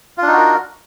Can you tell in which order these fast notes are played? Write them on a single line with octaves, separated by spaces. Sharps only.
F4 D4 D#4 F#4 A#4